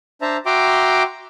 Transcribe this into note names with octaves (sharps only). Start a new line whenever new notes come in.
D4 C5 E5 A5 A#5
F#4 E5 G5 A#5 C6 D6